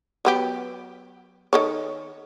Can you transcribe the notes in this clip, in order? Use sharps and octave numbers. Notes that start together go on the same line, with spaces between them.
F#3 B3 G4
D#3 A4 C#5